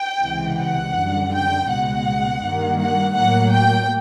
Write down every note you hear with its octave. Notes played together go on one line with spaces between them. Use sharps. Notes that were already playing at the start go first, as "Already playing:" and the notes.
Already playing: G5
C#2 C3 E3 G#3
F#5
F#2 D3 G3
G5
C#2 B2 G#3 F#5
G2 D#3 G3 A#3
F#5
A2 F#3 A#3 F#5
G5